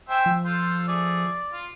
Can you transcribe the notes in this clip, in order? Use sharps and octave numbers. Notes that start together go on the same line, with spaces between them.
C5 E5 G5 G#5
F3
F4 A4 C5
A3 G#4 D5
F4